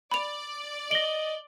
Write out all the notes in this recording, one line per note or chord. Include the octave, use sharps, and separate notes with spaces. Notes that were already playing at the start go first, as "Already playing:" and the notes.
D5 B5 F7
D#5 A#6 D7 F#7 G7